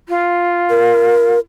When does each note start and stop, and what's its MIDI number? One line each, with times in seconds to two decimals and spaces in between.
0.08 1.35 65
0.70 1.39 70